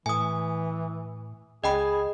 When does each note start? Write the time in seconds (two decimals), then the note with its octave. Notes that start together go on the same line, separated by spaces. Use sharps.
0.06 A2 E3 G#5 D#6
1.64 C#2 G#4 D#5 G5 B5